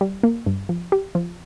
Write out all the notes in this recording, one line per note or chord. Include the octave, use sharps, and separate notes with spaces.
G3
A#3
G2
F3
G4
F3